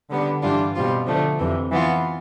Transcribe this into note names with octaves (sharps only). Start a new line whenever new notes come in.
D3 G3 B3 D4
G2 E3 G3 D4 F4
B2 G3 C4 F4
D3 F3 A3 D4
F2 C3 E3
E3 B3 F4